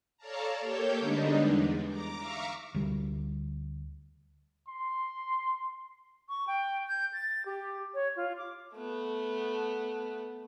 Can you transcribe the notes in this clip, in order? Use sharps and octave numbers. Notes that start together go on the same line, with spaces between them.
A4 C#5 D5 F5 A5 A#5
A#3 G4 A4 C#5 G6
D3 G3 G#3 B3 D4 D#4
E2
A#5 D6
E5 F5 A#5 C#6 D6
D2 G3
C6
C#6
G5
G6
A6
G4
C#5
F4
D6
A3 B3